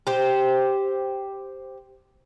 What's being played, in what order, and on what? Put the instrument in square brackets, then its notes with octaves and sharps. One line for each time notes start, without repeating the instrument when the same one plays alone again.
[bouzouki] G4 C5